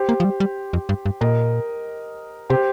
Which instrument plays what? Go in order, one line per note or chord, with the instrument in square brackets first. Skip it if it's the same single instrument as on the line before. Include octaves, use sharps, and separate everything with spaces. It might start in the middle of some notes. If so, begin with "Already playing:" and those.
Already playing: [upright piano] G4 C5
[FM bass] A#3
F3
G3
G3
F2
G2
G2
[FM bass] A#2 [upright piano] A#4 D#5
[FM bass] C3 [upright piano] G4 C5